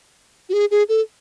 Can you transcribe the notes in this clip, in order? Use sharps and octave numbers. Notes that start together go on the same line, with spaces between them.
F#4
G#4
G#4
A4